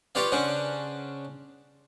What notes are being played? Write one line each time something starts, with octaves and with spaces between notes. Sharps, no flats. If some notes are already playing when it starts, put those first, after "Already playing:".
F4 G4 B4 C#5 D5 F5
C#3 C#4 D4 C5 F#5